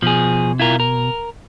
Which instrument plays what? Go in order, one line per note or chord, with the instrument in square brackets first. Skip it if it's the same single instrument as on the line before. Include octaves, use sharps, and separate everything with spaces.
[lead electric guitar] B2 [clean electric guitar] F3 G#4
[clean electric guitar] E4 F4 A#4
A#4